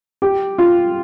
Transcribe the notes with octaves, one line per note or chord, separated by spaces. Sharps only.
G4
F4